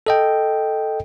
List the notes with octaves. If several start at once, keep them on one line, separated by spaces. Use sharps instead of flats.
A4 D#5 G5